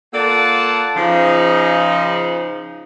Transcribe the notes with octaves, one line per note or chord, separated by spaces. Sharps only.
A#3 F4 A4 D5 F#5 A5
C#3 F3 D#4